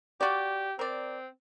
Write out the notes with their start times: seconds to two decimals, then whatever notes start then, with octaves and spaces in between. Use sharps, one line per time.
0.21 F#4 G4 D5
0.79 C4 A#4 D5